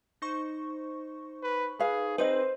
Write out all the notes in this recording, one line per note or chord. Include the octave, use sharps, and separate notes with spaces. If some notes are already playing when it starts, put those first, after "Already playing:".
D#4 C5 C#6
B4
G#4 B4 F5
C4 D#4 G#4 B4 C5 D#5